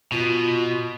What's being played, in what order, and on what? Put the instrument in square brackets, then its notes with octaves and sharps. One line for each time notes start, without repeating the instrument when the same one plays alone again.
[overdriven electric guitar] B2 [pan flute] F4